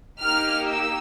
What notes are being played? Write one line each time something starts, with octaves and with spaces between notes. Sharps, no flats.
A#3 D#4 G4 F6
E6